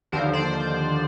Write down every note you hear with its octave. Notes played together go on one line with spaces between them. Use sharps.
D#2 D3 F3 A#4 C5
C5 D5